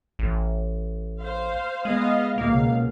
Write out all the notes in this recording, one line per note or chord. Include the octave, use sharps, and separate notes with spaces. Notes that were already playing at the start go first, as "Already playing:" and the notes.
A1
C5 F5
G#3 B3 D#5 F5
C#2 B2 A#3 F5